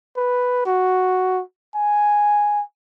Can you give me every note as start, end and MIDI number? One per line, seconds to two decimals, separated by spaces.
0.17 0.64 71
0.66 1.42 66
1.75 2.62 80